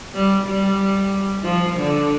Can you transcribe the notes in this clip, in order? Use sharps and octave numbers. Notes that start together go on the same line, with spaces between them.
G3
G3
F3
D3